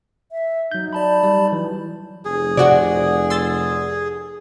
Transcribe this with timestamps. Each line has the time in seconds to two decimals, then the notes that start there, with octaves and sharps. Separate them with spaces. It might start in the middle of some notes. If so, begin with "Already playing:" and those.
0.32 E5
0.71 F#3 D#4 G6
0.93 D5 A5 B5
1.23 G3
1.52 E3 F#3
2.25 F1 G#4
2.57 C3 F#4 D5 F#5
3.30 C6 E6 A6